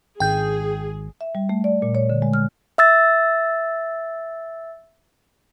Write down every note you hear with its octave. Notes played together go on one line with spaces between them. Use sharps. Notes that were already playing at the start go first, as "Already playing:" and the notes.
G#1 G#4 G5 G6
E5
G3
A3
D5
A#2
C#5
D3
G#3
F6
E5 E6 A6